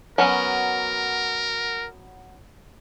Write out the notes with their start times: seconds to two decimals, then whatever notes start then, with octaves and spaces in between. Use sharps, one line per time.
0.18 F#3 B3 C#4 A#4